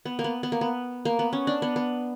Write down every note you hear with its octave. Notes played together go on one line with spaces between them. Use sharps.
B3
A#3
B3
B3
A#3
B3
A#3
B3
C#4
D4
B3
B3